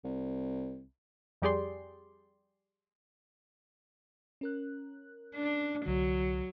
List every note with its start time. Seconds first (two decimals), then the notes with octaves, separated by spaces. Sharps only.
0.04 C2
1.42 F2 G3 G4 G#4 D5 C6
4.41 C#4 A#4 F#6
5.36 D4
5.86 C2 D3 F#3